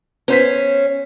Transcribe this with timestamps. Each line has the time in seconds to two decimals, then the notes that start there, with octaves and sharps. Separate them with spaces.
0.28 B3 C#4 C5 B6